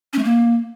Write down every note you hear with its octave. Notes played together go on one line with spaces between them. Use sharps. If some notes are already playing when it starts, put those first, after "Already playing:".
C#4
A3
A#3